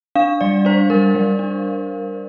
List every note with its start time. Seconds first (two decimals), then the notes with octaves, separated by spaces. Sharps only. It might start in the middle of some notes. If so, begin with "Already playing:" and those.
0.15 D4 F5
0.41 G3 D5
0.65 D4 C5
0.90 G3 A#4
1.15 G3
1.39 D4